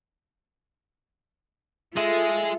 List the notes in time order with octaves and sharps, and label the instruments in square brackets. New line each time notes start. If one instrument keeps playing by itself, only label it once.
[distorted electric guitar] G#3 [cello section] F4 A4 [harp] E5